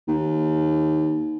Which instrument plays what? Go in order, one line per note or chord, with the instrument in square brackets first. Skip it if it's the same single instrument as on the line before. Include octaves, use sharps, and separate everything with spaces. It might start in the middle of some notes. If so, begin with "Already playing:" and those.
[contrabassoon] D#2